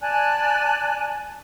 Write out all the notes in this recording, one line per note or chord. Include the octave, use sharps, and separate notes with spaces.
D5 G#5 A5 F#6